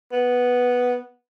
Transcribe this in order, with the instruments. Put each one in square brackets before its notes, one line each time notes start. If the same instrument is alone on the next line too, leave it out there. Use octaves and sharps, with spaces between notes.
[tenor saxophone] B3